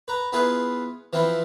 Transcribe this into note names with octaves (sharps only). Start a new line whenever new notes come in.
B4 A#5
B3 E4 F4 G#4 B4
E3 F3 C4 E4